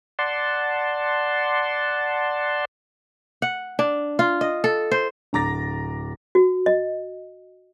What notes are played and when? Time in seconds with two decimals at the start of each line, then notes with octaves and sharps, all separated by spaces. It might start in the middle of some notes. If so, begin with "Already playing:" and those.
0.19 D5 F#5 A5 C6
3.42 F#5
3.79 D4
4.19 F4
4.41 D#5
4.64 A4
4.91 C5
5.33 D1 D3 A#5 D6 A6 A#6
6.35 F#4
6.66 D#5